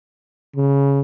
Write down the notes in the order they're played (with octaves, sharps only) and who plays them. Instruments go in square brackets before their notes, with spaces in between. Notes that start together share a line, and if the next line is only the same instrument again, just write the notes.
[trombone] C#3